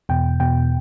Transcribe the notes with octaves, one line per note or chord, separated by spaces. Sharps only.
E2 B2 G5
E2 B2 G5